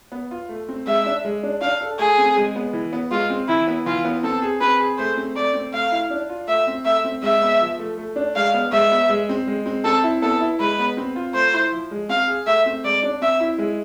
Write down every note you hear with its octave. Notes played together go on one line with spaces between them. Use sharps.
B3
F4
A3
C4
G#3 E5
D4
G#3
D4
D4 F5
A4
A3 G#4
C4
G#3
B3
E3
B3
G#3 F4
C4
E3 E4
B3
E3 F4
B3
C4 A4
G#4
C4 B4
G#4
A3 C5
C4
A3 D5
C4
A3 F5
E4
D4
F4
A3 E5
C4
A3 E5
C4
G#3 E5
B3
F3
A3
A3
D4
G#3 F5
B3
G#3 E5
B3
G#3
C4
G#3
C4
C4 A4
E4
B3 A4
E4
G#3 B4
B3
C4
F4
A3 C5
E4
F3
G#3
C4 F5
G#4
A3 E5
C4
G#3 D5
D4
C4 E5
E4
G#3